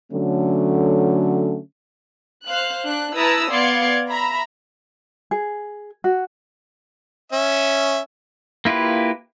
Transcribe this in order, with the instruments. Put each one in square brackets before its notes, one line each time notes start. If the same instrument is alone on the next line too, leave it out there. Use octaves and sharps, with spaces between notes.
[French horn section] D3 F#3 A3 C#4
[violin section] C5 F5 F#6
D4 F#6
E4 B4 A5 A#5 D#6 E6
B3 D5 F5 C6 G#6 C#7
E5 A#5 B5
[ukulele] G#4
F#4
[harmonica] C#4 E5
[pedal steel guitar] A#3 E4 F4 G4 B4